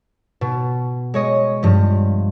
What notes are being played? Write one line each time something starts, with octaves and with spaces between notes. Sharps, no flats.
B2
G#3 C#5 D#5
G2 F3